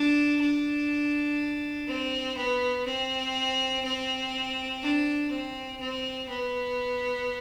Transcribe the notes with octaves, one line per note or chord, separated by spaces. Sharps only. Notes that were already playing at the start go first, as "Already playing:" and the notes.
Already playing: D4
D4
C4
B3
C4
C4
D4
C4
C4
B3